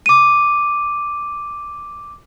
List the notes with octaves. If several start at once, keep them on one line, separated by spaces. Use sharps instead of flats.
D6 D#7